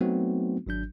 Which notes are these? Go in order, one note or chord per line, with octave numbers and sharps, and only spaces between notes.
F#3 A3 B3 C4 D#4 F#4
G#1 F#3 D4 G6